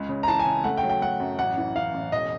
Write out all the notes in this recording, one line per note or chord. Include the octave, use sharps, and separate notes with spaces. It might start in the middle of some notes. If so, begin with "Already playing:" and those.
Already playing: C#2
C#3
A#5
E3 A5
G#5
C#3
A3 F#5
G5
F#3
G5
A3 F#5
F#2
A1 F#5
E3
E3 F5
A1
E1 D#5